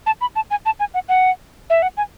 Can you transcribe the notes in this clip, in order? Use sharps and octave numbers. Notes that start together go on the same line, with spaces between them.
A5
B5
A5
G#5
A5
G#5
F#5
F#5
E5
F#5
G#5